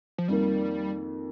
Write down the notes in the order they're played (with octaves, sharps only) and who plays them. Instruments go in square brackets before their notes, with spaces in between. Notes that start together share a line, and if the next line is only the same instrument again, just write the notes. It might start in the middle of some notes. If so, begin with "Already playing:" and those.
[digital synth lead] F3
[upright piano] F2 D#3 A#3 [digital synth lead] G3